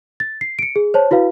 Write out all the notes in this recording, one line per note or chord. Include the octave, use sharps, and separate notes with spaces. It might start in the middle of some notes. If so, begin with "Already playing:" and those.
A6
C7
C#7 D7
G#4
C5 C#5 A5
E4 F#4 B4 F5